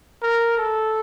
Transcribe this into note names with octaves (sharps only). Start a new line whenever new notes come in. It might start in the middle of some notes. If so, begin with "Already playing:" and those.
A#4
A4